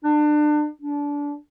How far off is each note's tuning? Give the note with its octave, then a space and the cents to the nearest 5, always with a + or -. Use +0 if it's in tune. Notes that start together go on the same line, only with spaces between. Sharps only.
D4 +30
D4 -25